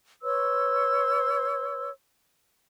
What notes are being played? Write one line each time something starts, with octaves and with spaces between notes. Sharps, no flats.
B4 C#5 C6 E6